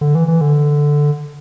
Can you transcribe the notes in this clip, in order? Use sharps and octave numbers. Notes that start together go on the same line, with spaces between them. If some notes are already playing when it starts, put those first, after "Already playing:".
D3
E3
E3
D3